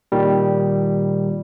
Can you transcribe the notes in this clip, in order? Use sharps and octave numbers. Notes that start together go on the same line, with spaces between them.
A#2 D#3 G3